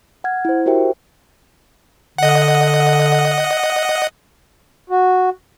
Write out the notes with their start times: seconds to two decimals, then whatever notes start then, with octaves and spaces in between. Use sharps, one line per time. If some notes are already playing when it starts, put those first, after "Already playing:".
0.24 F#5 F6 G#6
0.45 E4 C5
0.66 F#4 G4 A#4 C5 E5 G5
2.18 D3 D#5 F#5
4.90 F#4